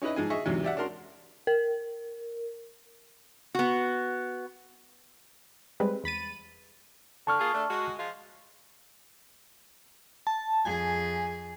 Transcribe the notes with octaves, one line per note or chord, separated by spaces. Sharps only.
C#4 D#4 E4 B4 D#5
G#2 F3 G#4 G#5
G#4 D#5 E5 C#6
E2 G#2 C3 F#3
G4 D5 E5 F#5
C#4 D4 F#4 A#4 C6
A#4
B3 F#4
G3 G#3 C4 B4
E2 B5 A6 D#7
D3 A5 C#6 F6
A#3 F4 G#4
A3 D4
G#3 F#4
F3 G#3 F4
A5
F2 G#4 G#5